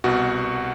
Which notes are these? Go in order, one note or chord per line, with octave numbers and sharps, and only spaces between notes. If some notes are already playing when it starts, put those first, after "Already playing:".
C2 B2 F#4